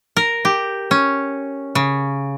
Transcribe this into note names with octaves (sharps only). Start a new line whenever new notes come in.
A#4
G4
C#4
C#3